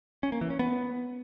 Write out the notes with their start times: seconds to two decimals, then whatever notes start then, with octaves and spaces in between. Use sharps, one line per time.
0.23 C#4
0.32 A#3
0.41 E3
0.50 C#4
0.59 B3